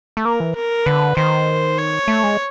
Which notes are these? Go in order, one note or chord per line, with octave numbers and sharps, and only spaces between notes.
A3
A#3 A#4
E3
A#4
D3 B4
D#3 C5
C#5
A3
G#3